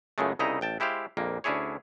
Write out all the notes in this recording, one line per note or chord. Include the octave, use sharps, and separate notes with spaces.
C#2 F#2 C#3 G#3 A3
C2 C#3 D#4 E4 D#5 A#5
A1 G5 A5
G#3 E4 G4 C5 F5
A#1 F2 A#3
D2 C#4 D4 E4 G#4 C#5